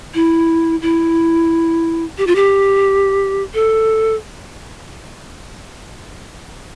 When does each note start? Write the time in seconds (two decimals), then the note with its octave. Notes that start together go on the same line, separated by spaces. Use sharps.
0.14 E4
0.82 E4
2.18 G4
2.27 F4
2.36 G4
3.54 A4